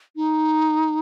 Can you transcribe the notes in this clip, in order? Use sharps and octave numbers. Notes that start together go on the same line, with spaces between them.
D#4